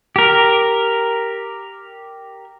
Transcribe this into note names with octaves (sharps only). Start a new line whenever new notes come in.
G4 A#4